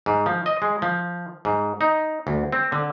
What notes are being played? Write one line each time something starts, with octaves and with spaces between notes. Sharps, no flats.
G#2
F3
D#5
G#3
F3
G#2
D#4
D2
C4
D3